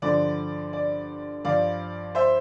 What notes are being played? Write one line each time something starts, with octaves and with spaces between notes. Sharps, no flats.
G2 D3 F3 D5
D5
G2 F3 D5 F5
C5 E5